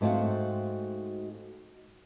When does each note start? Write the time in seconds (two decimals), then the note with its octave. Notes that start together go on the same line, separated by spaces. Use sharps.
0.01 G#2 A3 C4 F#4 F5